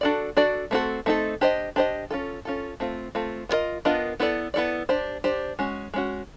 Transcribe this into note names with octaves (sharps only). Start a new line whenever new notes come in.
D4 F#4 A4 D5
D4 F#4 A4 D5
A3 C4 D#4 F#4 A4
A3 C4 D#4 F#4 A4
D4 G4 C5 D#5
D4 G4 C5 D#5
C#4 F4 A4
C#4 F4 A4
A3 C4 F4
A3 C4 F4
B3 D4 F4 A#4 D#5
B3 D4 F4 A#4 D#5
B3 E4 A4 D5
B3 E4 A4 D5
D4 G4 C5
D4 G4 C5
G#3 C#4 F#4
G#3 C#4 F#4